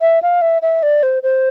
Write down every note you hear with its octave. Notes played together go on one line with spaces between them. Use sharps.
E5
F5
E5
E5
D5
C5
C5